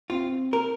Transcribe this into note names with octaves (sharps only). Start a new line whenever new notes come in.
C4 F4
A#4